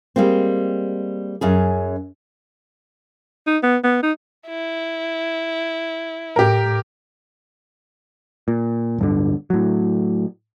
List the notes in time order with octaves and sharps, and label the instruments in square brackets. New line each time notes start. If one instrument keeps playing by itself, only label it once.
[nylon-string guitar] G3 G#3 A#3 C4
F#2 C#4 G#4
[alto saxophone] D#4
B3
B3
D#4
[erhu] E4
[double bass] A2 [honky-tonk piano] G4 A#4
[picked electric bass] A#2
D1 G2 D3
A2 F#3